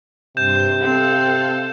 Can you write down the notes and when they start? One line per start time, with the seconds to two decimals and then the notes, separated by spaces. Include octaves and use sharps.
0.37 G2 C3 C5 G6 E7
0.81 C4 A4 F5